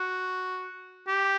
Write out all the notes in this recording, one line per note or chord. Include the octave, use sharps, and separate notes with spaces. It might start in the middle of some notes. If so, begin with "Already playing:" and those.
Already playing: F#4
G4